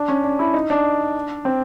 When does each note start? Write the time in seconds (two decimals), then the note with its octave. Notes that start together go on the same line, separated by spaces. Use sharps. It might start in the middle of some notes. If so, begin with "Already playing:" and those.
Already playing: D4
0.08 C#4
0.24 D4
0.39 E4
0.54 D#4
0.70 D4
1.45 C4